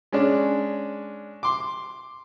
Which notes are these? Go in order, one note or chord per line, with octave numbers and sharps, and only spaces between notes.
G#3 C#4 D4
C6 D6